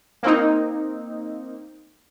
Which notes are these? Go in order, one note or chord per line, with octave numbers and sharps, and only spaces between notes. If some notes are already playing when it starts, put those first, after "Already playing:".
A#3 C4 D#4